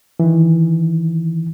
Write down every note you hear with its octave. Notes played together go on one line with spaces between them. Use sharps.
D#3 E3